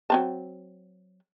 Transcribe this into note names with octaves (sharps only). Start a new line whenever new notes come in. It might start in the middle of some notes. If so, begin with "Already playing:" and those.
F#3 C4 A5